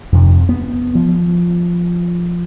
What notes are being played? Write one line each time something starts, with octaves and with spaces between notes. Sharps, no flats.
F2 C3
B3
F3